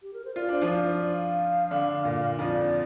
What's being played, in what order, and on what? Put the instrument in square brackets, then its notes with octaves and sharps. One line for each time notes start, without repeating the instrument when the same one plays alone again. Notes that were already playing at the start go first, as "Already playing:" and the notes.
[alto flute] G4
A#4
C5
[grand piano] F4 [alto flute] D5
[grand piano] D4 [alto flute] C5
[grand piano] F3 F4
[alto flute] D5
D5
F5
[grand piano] D3 D4
A#2 A#3
[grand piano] F2 F3 [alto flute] D5